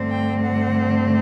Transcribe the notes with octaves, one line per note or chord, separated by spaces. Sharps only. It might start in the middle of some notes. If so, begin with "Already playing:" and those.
Already playing: G2 D3 A3 C4
G5
F#5